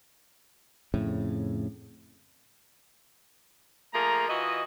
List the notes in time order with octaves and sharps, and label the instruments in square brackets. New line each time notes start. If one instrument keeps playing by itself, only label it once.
[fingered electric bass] F2 A2 C#3
[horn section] F3 A3 A#3 G#4 A#5
E3 F4 F#4 D#5